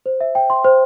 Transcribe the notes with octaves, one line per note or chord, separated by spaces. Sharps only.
C5
E5
G5
C6
C5